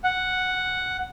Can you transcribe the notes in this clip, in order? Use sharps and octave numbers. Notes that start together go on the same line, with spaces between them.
F#5